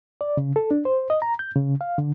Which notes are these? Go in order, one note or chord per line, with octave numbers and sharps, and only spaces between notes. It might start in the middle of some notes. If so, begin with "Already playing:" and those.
D5
C#3
A4
D4
C5
D#5
A#5
G6
C#3
F5
D3